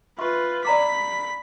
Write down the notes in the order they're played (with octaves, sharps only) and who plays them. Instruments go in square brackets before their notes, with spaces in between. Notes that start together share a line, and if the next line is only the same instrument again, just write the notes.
[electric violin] F4 B4 [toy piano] E5 C6 C#6
[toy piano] D5 A#5 D6 [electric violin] B5 B6